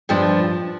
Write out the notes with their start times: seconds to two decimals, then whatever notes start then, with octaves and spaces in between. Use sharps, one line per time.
0.09 G2 F3 D4